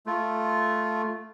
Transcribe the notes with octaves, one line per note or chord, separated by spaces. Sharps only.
A3 F4